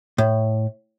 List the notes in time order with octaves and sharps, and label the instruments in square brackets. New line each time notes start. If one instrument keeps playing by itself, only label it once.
[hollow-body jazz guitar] A2